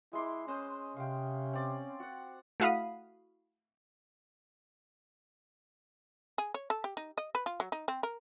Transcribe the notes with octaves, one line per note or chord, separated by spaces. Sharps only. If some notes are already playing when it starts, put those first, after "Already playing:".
G#3 E4 C6 D6
C#4 B4 C5 D#5
C3 F5 G5
C4 D5
F#4 F#5
A3 E4 F#4 F5 B5 D#6
G#4
C#5
A4
G4
D#4
D#5
B4
F4
F#3
D#4
C4
A#4